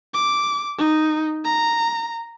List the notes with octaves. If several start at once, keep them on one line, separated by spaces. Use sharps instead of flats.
D6
D#4
A#5